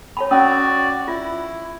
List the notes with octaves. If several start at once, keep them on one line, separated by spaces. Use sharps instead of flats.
C#5 A5 B5
C#4 F#4 D5 D#6 E6
E4 F4